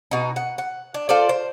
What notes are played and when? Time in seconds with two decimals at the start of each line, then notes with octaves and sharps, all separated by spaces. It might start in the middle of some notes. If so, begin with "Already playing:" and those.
0.11 B2 D#4
0.36 F#5
0.58 F#5
0.94 D4
1.09 F4 A4 C5 D5
1.29 C5